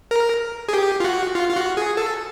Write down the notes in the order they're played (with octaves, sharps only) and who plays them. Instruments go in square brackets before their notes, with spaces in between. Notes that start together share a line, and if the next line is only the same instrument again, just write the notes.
[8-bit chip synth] A#4
G#4
G4
F4
F#4
F4
F4
F#4
G#4
A4